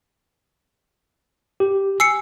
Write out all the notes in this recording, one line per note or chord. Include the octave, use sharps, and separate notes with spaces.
G4
G#5 E6 C7 C#7